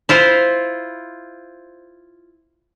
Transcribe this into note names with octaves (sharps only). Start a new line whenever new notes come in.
E4 F4 C5